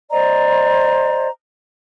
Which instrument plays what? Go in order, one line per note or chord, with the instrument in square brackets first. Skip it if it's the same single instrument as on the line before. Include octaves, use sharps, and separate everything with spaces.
[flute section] C5 D5 D#5 A#5